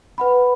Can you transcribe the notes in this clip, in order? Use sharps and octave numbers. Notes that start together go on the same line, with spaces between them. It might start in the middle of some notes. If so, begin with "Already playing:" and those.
B4 F#5 B5